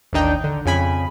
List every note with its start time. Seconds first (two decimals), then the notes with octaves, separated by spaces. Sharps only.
0.13 A1 D#2 D4 D#4 G5
0.44 D3
0.65 F2 C#3 G#5 B5